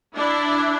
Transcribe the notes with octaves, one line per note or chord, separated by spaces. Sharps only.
D4 E4